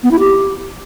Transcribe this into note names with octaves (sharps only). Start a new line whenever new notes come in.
B3
E4
G4